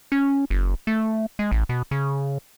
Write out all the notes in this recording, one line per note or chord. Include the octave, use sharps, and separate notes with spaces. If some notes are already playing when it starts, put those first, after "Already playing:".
C#4
F#1
A3
G#3
A1
B2
C#3